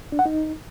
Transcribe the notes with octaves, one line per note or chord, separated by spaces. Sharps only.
D4
F#5
D#4